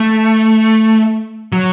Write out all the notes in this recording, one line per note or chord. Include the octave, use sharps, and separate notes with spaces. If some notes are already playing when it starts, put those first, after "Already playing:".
Already playing: A3
F#3